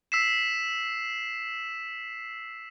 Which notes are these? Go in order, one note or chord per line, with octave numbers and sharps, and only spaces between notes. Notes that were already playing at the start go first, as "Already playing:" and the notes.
E6 B6 C7 E7